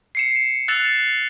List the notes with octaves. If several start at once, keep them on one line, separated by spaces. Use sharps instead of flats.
C7 C#7 E7
E6 F#6 A6 C#7 E7 F7